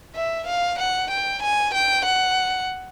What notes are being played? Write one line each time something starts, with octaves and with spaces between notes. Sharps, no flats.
E5
F5
F#5
G5
G#5
G5
F#5